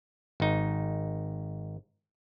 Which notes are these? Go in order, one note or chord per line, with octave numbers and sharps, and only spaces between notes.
G#1 D#4